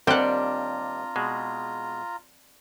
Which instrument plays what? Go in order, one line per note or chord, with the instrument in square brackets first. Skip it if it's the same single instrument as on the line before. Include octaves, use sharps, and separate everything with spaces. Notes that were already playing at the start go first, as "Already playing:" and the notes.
[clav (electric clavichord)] D#2 G3 G5 [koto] C4 F#5 [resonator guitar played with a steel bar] D4 [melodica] F4 A#5
[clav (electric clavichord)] B2 G#3